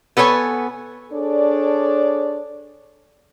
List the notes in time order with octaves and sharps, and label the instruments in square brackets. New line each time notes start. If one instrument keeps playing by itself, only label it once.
[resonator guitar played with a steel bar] B3 A4 B4 C#5 G#5
[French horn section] D4 G#4 A4 C#5 D5